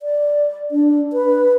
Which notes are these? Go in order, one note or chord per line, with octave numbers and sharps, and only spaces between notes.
D5
D4
B4